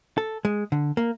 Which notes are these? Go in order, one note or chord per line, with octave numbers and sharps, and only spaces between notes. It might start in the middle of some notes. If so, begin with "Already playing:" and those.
A4
G#3
D3
A#3